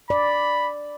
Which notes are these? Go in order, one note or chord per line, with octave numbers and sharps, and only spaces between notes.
D5 B5